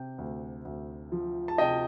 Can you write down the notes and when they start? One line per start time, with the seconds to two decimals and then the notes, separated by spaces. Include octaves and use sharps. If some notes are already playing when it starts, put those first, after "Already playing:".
Already playing: C3 G5
0.18 D2
0.65 D2
1.12 F3
1.48 A5
1.58 C3 D#5 G5